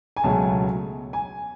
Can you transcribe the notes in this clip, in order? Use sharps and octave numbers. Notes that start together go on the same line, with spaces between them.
G#5
C#2 B2 F#3 A3 A5
G#5